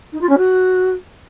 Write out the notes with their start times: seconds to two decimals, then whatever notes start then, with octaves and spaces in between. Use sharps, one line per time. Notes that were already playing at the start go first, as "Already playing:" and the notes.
0.12 D#4
0.21 F4
0.29 C#4
0.38 F#4